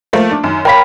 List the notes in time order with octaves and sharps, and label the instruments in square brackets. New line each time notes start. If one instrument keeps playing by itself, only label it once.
[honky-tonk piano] F3 A3 A#3
D4
F#2 D#3
[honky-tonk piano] A#4 C#5 F5 [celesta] G5 B5 B6